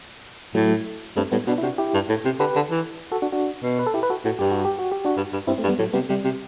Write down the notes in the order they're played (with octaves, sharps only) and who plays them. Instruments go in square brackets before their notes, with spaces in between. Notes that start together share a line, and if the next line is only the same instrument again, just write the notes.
[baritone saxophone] A2 [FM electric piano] F#3 A3
[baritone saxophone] G2 [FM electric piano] A3 C4
[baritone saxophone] A2 [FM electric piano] G3 B3
[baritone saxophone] B2 [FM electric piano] B3 D4
[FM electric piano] E4
[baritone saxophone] C3 [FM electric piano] D4 F#4
[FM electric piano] E4 G4
[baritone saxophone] G2
A2
C3
[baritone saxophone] D3 [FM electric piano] G4 B4
[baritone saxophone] D3
E3
[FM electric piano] F#4 A4
D4 F#4
D4 F#4
[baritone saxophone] B2
[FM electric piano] B4
A4
E4 G4
B4
F#4 A4
[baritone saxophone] A2 [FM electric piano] F#4
[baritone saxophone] G2 [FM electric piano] G4
[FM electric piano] F#4
G4
F#4
G4
D4 F#4
[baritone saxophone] G2
G2
[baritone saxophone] G2 [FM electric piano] C4 E4
[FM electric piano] A3 C4
[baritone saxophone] G2
[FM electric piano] G3 B3
[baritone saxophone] A2 [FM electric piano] F#3 A3
[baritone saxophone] C3 [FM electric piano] G3 B3
[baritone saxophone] C3 [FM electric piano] G3
[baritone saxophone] C3